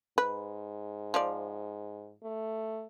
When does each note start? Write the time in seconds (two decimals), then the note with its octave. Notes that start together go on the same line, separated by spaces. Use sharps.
0.18 G#2 B4
1.14 F3 D5
2.23 A3